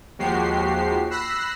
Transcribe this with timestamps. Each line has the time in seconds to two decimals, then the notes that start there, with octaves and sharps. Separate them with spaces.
0.19 D#2 F3 G#3 F#4 G4 C7
1.11 B5 E6 F#6 A#6 C7